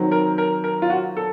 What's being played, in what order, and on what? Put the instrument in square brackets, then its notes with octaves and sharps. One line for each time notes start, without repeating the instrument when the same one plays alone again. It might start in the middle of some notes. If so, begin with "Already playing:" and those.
Already playing: [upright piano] D#3 F#3 C4
[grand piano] A#4
A#4
A#4
F4
F#4
A4